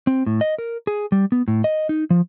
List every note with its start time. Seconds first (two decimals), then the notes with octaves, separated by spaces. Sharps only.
0.07 C4
0.26 A2
0.41 D#5
0.58 A#4
0.87 G#4
1.12 G3
1.32 B3
1.48 A2
1.64 D#5
1.89 D#4
2.10 F3